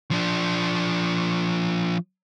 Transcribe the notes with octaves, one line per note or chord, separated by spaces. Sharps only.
F3 D4